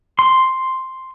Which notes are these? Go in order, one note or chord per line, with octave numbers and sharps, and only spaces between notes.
C6